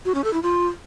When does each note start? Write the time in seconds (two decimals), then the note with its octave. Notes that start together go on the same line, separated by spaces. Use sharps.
0.05 F#4
0.15 C#4
0.24 A4
0.33 E4
0.43 F4